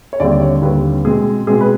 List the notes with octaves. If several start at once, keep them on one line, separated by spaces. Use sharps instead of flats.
C#5
D#2 D3 G3 C4 D5
C#5
D#2 D3 G3 C4 B4
B2 G#3 C4 G#4
B2 G#3 C4 G#4
B4